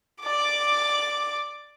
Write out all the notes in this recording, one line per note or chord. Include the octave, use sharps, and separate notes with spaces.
D5 D6